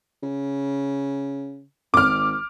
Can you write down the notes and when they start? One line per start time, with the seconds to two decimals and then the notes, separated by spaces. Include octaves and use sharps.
0.23 C#3
1.94 G#1 D6 F6